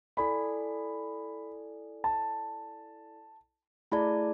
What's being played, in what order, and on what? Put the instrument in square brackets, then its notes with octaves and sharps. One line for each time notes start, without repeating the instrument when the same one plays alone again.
[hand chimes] E4 A4 D5 G#5 [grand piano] B5
[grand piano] A5
[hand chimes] A3 E4 G#4 D5 A5 [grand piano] B5